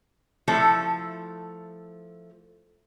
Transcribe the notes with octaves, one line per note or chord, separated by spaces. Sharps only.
F3 A3 E4 A4 E5